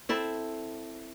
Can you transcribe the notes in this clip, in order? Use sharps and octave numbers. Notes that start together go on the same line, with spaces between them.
C4 E4 A4